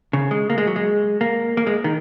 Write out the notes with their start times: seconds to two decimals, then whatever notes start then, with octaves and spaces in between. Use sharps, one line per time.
0.13 C#3
0.31 G#3
0.50 A#3
0.58 G#3
0.67 F#3
0.76 G#3
1.21 A#3
1.57 A#3
1.67 G#3
1.84 D#3